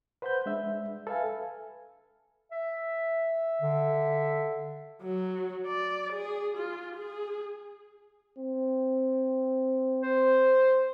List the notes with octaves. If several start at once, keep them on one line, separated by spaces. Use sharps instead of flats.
B4 C5 F#5 B5 G6
G#3 D4 E5
A4 B4 E5 F5 G#5
E5
D3
F#3
D5
G#4
F4
G#4
C4
C5